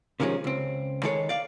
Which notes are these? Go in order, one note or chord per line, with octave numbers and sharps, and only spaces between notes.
C3 D#3 F3 G#3 C#4
C#2 C4
D#3 G#3 G#4 A4 C#5
D5 F5